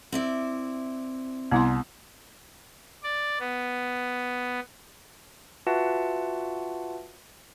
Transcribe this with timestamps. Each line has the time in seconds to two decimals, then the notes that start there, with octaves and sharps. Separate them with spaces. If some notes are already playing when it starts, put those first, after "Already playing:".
0.12 C4 E4 D5
1.51 C2 B3 E4 C6
3.03 D5
3.40 B3
5.67 F4 F#4 B4 E5 F#5 A5